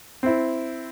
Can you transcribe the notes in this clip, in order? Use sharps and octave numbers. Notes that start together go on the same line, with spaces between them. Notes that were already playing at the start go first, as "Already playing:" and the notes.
C4 E4